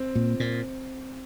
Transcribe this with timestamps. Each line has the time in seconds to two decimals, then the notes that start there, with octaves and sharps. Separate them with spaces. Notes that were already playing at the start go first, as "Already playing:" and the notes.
Already playing: C4
0.15 A#2
0.40 A#2